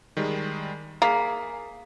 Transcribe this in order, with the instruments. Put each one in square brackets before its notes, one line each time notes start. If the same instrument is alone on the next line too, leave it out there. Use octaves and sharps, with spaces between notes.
[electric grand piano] D#3 G3 G#3
[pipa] A#3 [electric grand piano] G#4 B6